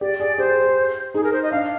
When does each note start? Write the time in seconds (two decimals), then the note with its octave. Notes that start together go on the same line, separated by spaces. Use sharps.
0.01 G4 D5
0.20 G#4 D5
0.38 G4 C5
0.51 G#4
0.64 G4
1.14 D#4 G#4
1.24 A#4
1.33 C5
1.43 D#5
1.52 D4 F5